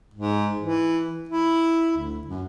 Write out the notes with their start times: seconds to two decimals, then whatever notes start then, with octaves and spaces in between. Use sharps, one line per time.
0.14 G#2
0.60 E3
1.29 E4
1.97 D2
2.27 F#2